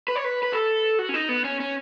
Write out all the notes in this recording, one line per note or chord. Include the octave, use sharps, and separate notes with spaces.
B4
C#5
B4
B4
A4
F#4
C#4
D#4
B3
C#4
C#4